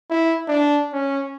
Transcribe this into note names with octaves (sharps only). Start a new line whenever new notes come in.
E4
D4
C#4